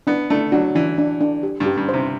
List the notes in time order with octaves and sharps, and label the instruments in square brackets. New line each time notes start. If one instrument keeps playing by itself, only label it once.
[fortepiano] B3 [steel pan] D4
[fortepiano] A3 [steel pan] D4
[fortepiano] F#3 [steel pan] D4
[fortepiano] E3 [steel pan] D4
[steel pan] D4
D4
G4
[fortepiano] G2
[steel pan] G4
[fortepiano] G2
[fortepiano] C3 [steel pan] C5